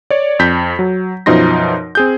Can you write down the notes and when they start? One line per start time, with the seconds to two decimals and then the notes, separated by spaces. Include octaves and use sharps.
0.10 C#5 D5
0.39 F2 G6 B6
0.79 F#3
1.26 F#2 B2 F3 D#4 C6 A#6
1.95 C4 G#4 G6